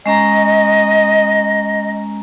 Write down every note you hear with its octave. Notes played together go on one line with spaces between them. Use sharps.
G#3 C#4 D#5 A#5